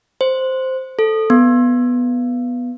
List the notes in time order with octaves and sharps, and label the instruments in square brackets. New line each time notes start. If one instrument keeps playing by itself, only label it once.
[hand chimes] C5
A4
B3